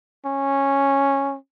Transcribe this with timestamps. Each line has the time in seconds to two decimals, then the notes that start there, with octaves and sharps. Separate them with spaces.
0.26 C#4